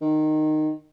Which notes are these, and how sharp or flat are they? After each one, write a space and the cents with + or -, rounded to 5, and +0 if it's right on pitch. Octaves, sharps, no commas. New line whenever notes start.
D#3 -15